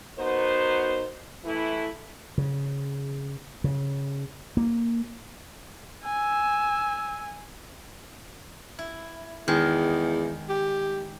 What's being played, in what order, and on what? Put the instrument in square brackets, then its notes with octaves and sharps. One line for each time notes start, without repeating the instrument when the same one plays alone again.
[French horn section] B3 D#4 F#4 A#4 C5
E3 A3 E4
[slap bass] C#3
C#3
A#3
[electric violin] G#5 [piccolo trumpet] E6
[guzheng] E4
[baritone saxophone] E2 [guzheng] D#3 G#3
[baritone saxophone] G4